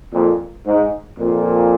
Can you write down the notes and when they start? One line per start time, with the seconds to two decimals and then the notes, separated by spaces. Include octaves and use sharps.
0.14 F2 A#2
0.67 G#2
1.19 F2 A#2